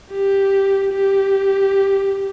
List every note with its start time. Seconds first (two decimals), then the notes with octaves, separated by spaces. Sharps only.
0.11 G4
0.92 G4